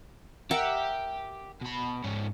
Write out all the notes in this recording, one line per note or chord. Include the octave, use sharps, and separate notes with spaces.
G4 A#4 E5 F#5
B2 B5
G#2 C#4